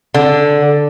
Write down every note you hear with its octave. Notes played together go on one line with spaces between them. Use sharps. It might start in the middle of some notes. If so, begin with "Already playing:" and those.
D3